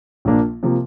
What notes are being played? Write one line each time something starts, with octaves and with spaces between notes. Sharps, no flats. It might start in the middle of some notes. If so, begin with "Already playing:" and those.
A#1 A#2 F3 A#3 D4
C3 F3 A#3